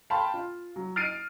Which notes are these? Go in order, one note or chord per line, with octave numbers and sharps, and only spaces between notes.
F5 G5 A5 B5 C6
F4
F#3
F6 A6 C7 D7 D#7